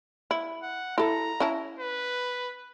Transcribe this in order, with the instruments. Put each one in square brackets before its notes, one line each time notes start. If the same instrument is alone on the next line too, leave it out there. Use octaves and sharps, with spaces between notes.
[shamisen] E4
[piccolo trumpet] F#5
[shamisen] E4 A4 [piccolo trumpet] A#5
[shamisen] C#4 E4 A5
[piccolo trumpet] B4